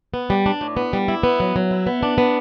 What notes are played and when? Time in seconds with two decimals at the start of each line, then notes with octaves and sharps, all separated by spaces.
0.14 B3
0.30 G3
0.46 D4
0.61 A2
0.77 B3
0.93 G3
1.08 E4
1.23 B3
1.40 F#3
1.56 F#3
1.71 E4
1.86 B3
2.03 D4
2.18 B3